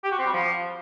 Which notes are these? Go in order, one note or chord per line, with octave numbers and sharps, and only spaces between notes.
G4
F#4
C4
G3
F3